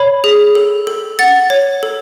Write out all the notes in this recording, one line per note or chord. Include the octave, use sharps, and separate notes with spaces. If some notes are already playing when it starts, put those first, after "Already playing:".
Already playing: C#5 B5
G#4
A4
A4
F#5 A6
C#5
A4